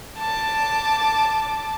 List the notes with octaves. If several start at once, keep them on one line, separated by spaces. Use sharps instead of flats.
A5 D6